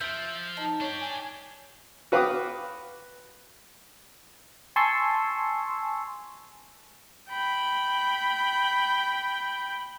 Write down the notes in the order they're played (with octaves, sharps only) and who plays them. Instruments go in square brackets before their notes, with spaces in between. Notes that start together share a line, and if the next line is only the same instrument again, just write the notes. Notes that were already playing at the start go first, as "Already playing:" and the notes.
[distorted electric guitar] F3 [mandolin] E5 [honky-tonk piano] G6 D7
[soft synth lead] D#4 [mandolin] A5
[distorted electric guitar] D4 G4 [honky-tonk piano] C#5
[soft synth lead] G#5
[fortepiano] F#4 B4 F5 G5 D6 D#6
[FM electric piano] G#5 A5 C6 C#6 E6
[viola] G5 B5